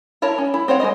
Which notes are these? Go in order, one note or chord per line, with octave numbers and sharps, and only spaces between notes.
E4 A#4 C#5 A5
C#4
E4
C4 C5 C#5 F#5
G#3 A#3 C5 D#5